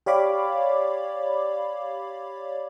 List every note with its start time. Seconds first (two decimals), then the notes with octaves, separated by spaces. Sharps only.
0.06 G4 C#5 D5 F5 B5 D6